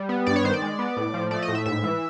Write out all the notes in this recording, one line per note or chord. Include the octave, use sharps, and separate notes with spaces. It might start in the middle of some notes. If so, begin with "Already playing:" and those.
Already playing: G3
B3
G2 D5
C#5
D#3 C5
D5
G#3
B3
A2
F3
A3 D5
D#5
A2
E5
G#2 E5
E3